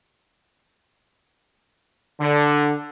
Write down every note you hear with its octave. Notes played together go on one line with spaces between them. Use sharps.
D3